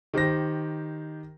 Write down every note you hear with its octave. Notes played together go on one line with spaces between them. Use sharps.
D#3 G4 C5 A#6